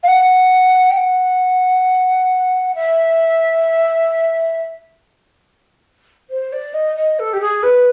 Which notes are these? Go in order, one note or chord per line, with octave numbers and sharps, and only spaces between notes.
F5
F#5
G5
F#5
E5
C5
D5
D#5
D#5
A4
G4
G#4
B4